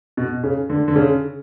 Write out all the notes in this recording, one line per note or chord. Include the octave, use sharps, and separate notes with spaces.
B2
C#3
D3
D3
C#3